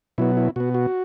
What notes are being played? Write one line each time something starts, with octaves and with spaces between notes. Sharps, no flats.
B2 F#3 B3 E4
E4
B2 B3 F#4
F#4